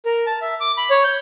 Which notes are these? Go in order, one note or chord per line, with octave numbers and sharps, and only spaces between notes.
A#4
A5
E5
D6
B5
C#5
G6